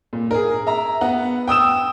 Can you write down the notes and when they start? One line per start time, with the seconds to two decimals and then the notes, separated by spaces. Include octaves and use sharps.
0.13 A#2
0.31 G#4 A#4
0.67 E5 A#5
1.01 B3 F#5
1.48 G5 D#6 E6 E7